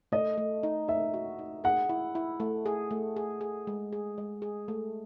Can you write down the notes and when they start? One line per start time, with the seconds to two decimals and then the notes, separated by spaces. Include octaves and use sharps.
0.12 A3 D#5
0.38 A3
0.63 D#4
0.88 D#4 E5
1.14 F#4
1.39 D#4
1.64 G#4 F#5
1.89 E4
2.15 E4
2.40 A3
2.66 G#4
2.91 A3
3.16 G#4
3.41 G#4
3.67 G#3
3.93 G#4
4.18 G#3
4.42 G#4
4.68 A3